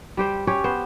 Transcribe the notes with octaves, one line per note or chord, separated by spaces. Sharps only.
G3 G4 C5
C#4 G4 C#5
B3 C5